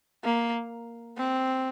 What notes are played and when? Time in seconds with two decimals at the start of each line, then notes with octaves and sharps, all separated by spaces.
0.24 A#3
1.17 C4